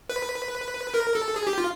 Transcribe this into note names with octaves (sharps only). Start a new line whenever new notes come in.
B4
A#4
A4
G#4
G4
F4